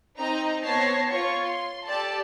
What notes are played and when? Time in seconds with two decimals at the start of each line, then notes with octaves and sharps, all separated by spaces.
0.19 C4 D#4 D#5 A#5
0.64 B3 C4 C#5 A5 A#6 C7
1.11 F4 C#5 C#6
1.46 C6
1.86 G4 A4 D5 A5